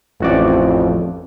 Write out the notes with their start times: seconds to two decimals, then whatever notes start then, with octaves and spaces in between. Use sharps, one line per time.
0.21 A1 F2 F#4 D5